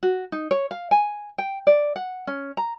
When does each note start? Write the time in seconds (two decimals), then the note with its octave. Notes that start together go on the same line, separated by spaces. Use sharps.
0.03 F#4
0.32 D#4
0.51 C#5
0.71 F5
0.91 G#5
1.38 G5
1.67 D5
1.96 F#5
2.27 C#4
2.57 A#5